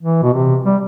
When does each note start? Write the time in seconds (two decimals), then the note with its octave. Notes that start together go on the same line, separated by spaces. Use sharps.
0.03 E3
0.23 B2
0.33 C3
0.65 G3